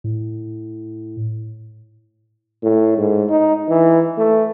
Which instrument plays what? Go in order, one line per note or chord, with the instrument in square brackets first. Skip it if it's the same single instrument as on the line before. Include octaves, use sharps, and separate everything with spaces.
[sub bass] A2
[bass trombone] A2
G#2
D#4
E3
A3